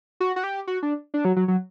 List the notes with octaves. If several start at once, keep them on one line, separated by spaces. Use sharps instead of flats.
F#4
F#4
G4
F#4
D4
D4
F#3
F#3
F#3